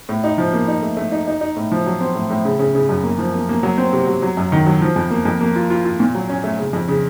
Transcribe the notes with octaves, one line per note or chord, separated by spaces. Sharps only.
A2
D#4
F3
A#3
D#4
A3
A3
D#4
D#4
D#4
A2
F3
F#3
C4
A2
A2
C#3
C#3
C#3
F#2
A#3
F3
A#3
A#3
F#3
C4
C3
F#3
F#3
F#2
D#3
F#3
F3
F2
A#3
F2
A#3
F4
F4
F4
A#2
F#3
C#4
A3
C#3
F2
C#3